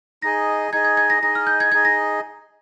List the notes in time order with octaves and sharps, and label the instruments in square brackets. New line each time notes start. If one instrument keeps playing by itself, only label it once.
[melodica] D#4 G#4 D#5 [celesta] A#6
[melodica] D#4 G#4 D#5 [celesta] G#6
[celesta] G#6
G#6
A#6
[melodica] D#4 G#4 D#5 [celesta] A#6
[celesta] F6
G6
G#6
[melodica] D#4 G#4 D#5 [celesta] G#6
[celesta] A#6